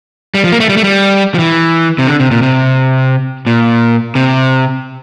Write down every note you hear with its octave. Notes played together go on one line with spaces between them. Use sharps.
G3
F3
A#3
A3
G3
A3
G3
F3
E3
C3
D3
C3
A#2
C3
A#2
C3